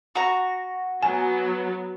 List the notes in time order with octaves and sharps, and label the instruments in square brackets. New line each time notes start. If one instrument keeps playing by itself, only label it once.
[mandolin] F#4 A#5
[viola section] F#3 B3 [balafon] G#5